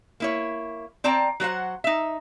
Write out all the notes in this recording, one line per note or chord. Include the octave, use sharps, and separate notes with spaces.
A#3 E4 C#5
C4 D5 G5 A5 A#5
F#3 F#4 C5 F#5
D#4 E5